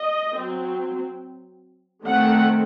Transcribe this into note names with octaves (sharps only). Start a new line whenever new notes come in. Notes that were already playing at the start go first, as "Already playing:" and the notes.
Already playing: D#5
F#3 C4
D#3 A3 C4 F#5